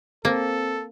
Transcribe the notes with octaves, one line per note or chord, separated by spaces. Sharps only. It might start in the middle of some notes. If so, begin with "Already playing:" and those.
A#3 C4 A4